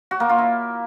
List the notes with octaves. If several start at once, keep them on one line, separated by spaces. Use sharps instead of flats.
F#4
A#3
F4
E4